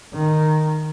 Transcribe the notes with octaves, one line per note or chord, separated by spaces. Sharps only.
D#3